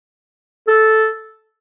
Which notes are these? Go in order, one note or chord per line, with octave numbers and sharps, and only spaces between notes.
A4